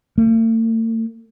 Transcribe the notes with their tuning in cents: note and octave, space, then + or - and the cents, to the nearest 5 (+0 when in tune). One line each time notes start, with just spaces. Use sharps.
A3 +45